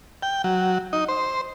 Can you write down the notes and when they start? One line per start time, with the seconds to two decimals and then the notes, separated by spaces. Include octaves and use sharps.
0.22 G5
0.44 F#3
0.93 D#4
1.08 C5